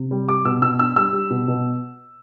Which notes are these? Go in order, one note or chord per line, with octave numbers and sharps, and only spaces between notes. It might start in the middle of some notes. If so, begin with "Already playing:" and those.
Already playing: C3
G3
G3 D6
B2 E6
B2 E6
D4 E6
G3 E6
G3
B2
B2